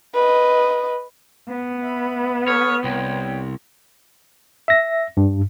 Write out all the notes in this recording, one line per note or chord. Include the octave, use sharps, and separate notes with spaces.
B4 D#5
B3
E5 B5
A4 C#5 D#6 F6
C2 C#5 G5
E5 A#6
G2